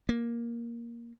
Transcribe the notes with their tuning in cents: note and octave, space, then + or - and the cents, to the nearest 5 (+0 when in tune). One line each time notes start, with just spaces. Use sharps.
A#3 +10